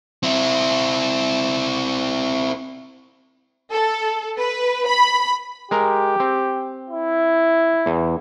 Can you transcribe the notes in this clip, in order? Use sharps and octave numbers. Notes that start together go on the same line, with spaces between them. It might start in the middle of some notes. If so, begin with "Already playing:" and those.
C4 E4
A4
B4
B5
G#3 G4 A#4 A#5
C4
E4
E2